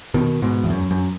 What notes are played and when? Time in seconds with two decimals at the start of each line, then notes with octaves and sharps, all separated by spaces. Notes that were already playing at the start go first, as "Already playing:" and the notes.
0.14 B2 D#3
0.42 G#2 B2
0.64 E2
0.70 F#2
0.91 F#2